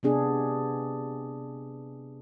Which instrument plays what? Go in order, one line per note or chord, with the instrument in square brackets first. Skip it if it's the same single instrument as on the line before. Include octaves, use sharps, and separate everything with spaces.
[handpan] C3 B3 D4 G#4